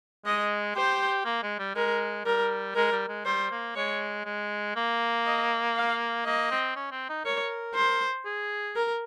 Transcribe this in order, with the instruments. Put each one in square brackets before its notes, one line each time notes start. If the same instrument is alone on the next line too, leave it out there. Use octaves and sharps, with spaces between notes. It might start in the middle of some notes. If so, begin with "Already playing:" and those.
[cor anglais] G#3 [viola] D#5
[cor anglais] G4 [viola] C5
[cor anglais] A#3
G#3
G3
[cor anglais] G#3 [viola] A#4
[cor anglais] G3 [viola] A#4
[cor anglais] G#3 [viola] A#4
[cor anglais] G3
G#3
[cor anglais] G3 [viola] C5
[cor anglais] A#3
[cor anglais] G#3 [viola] C#5
[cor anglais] G#3
A#3
[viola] D#5
F5
[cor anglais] A#3 [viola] D#5
[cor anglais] C4
C#4
C4
D#4
[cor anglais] A#4 [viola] C#5
[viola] C5
[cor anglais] G#4
[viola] A#4